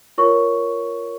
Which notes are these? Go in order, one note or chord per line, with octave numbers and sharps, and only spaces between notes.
F4 A#4 C#5 C#6